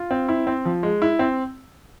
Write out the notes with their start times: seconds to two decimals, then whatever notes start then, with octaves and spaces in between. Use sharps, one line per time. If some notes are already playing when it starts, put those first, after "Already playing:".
Already playing: F4
0.11 C4
0.29 E4
0.47 C4
0.65 F3
0.83 G#3
1.02 E4
1.19 C4